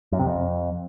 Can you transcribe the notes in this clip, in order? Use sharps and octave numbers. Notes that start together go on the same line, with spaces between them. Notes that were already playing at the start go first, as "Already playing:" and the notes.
F#2
C3
F2